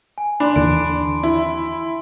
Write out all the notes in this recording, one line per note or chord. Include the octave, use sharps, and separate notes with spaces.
G#5
D4 B5 C6
D#2 D3 E3 D7
E4